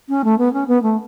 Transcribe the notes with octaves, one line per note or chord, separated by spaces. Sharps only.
C#4
A3
B3
C#4
B3
A3